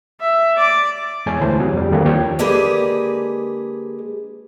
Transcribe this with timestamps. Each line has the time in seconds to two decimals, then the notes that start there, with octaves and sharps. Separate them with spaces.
0.20 E5
0.56 D5 D6
1.26 E2 G#3 C#5 G#5 A5
1.41 D2 E3 C5
1.59 C3 F#3 G#4
1.73 F2 G3
1.91 D#2 D3 G3 A#3 C4
2.05 D#2 F3 G4 C#5 G5 G#6
2.39 D3 G#3 A#3 G4 G#4 B4